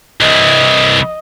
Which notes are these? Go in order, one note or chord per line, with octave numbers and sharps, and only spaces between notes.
C2 E3 D#5